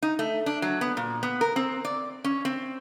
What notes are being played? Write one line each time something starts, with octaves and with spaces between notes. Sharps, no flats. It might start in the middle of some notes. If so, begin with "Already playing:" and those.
D#4
A3
D4
F#3
B3
A#2
B3
A#4
C4
D5
C#4
C4